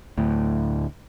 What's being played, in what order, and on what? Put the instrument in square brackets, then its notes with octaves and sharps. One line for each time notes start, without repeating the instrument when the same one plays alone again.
[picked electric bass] D2 A2